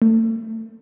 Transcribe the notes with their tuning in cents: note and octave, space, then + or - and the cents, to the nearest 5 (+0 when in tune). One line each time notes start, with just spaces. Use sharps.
A3 +30